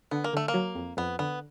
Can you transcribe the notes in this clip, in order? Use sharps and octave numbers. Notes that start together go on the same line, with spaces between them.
D3 B3
A#3
D3 A3
A#3
F#3
F2
F2 B3
D3 B3